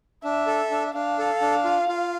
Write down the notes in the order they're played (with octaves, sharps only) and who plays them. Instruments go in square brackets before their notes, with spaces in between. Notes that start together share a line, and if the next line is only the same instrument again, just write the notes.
[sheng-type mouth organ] D4 [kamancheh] E5
[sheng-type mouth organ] A4
D4
[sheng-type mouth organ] D4 [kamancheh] F5
[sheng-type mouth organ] A4
D4
F4
F4